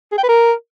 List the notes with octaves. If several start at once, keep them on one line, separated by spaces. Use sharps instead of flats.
G#4
G5
B4
A#4